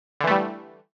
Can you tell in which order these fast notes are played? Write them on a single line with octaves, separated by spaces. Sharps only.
D3 E3 A3 G3